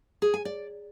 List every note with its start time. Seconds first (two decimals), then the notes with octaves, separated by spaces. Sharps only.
0.22 G#4
0.34 G#5
0.45 D5